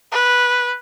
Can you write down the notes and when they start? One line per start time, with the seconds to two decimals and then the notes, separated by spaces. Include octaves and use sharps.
0.12 B4